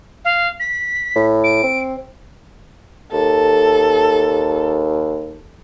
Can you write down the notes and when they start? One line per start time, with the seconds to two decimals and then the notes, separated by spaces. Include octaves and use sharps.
0.24 F5
0.59 B6
1.16 A2
1.44 D7
1.64 C4
3.13 D#2 A4